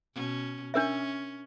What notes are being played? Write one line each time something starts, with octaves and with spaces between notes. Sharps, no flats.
B2 C#4
C#4 D4 A#4 E5